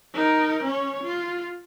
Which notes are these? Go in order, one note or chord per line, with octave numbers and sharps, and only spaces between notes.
D#4 A#4
C#4 C#5
F4